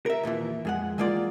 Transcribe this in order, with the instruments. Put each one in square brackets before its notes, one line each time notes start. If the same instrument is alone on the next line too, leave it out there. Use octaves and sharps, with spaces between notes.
[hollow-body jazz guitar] A#4 E5
D#2 A#2 D#3 E3
F2 G#3 F#5
E3 G#3 A#3 F4 D5